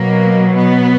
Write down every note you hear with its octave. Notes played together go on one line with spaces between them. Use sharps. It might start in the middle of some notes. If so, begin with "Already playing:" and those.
Already playing: B2 F#3 A#3
B3